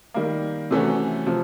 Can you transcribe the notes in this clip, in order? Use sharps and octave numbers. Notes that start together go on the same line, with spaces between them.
D#3 G3 A#3
C3 E3 A3 C#4 F#4
C3 F3